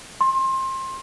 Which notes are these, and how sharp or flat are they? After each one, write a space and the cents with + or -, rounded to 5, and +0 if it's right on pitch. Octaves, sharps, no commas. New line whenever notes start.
C6 +25